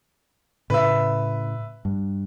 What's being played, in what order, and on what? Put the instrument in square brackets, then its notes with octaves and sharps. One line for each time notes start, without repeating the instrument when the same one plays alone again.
[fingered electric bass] A2 C#3 [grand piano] B4 E5
[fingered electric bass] G2